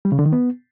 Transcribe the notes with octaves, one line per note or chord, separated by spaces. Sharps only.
G3
C#3
D3
D#3
B3